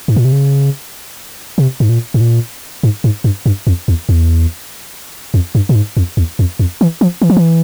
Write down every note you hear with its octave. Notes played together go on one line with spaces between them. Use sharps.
G#2
A#2
C3
C#3
C3
G#2
A#2
G#2
A#2
G#2
G#2
G2
G2
F2
E2
E2
F2
G2
A#2
G#2
F2
E2
F2
F2
E3
F3
E3
F3
E3